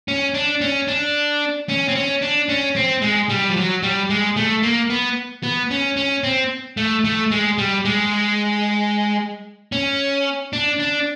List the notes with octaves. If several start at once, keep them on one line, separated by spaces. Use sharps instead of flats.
C#4
D4
C#4
D4
C#4
C4
C#4
D4
C#4
C4
G#3
G3
F3
F#3
G3
G#3
A3
A#3
B3
B3
C#4
C#4
C4
A3
A3
G#3
G3
G#3
C#4
D4
D4